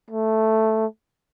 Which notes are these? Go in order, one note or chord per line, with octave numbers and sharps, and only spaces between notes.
A3